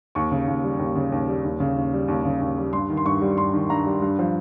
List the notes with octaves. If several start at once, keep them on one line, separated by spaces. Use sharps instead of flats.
D#2 C#6
C#3
D#2
G3
D#2
C#3
D#2
G3
D#2
C#3
D#2
G3
D#2
C#3
D#2
G3
G2 C6
D#3
C6
G2 C#6
G3
G2 C6
D#3
G2 A#5
G3
G2
F3